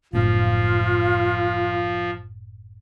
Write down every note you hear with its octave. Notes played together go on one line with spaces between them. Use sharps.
F#1 A2 F3 F4